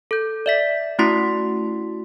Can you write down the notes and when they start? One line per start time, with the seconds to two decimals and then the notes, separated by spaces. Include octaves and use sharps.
0.11 A4 G6
0.46 D5 E5 B6
0.99 A3 C#4 E4 F#4 C6 B6